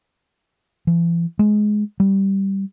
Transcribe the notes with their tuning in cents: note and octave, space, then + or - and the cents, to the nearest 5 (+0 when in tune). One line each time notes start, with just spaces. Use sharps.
E3 +45
G#3 +15
G3 -5